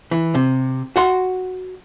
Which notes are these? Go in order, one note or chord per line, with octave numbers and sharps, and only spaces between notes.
E3
C3
F#4 F#5 C6